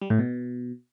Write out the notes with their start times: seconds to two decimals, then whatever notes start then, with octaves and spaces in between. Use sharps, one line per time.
0.02 G3
0.10 A2
0.19 B2